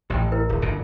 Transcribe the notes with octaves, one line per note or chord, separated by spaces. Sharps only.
A1 A2 G4 G5
E4 A#4 B4
D1
G1 A#2 C#3